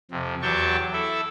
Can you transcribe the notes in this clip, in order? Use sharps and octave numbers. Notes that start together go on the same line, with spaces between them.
F2 C3
E2 F#3 G4 G5 A5 C#6
E4 A4 E5